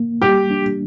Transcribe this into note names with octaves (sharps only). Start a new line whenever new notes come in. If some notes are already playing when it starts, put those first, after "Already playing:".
Already playing: A#3
G3 G4
D4